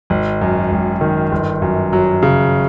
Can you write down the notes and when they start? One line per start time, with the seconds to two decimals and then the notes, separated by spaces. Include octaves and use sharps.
0.10 G#1
0.41 F#2
0.71 G#1
1.01 D#3
1.32 G1
1.62 F#2
1.93 F#3
2.23 C#3